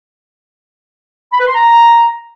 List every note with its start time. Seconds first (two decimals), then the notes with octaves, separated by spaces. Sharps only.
1.32 B5
1.40 B4
1.47 C6
1.55 A#5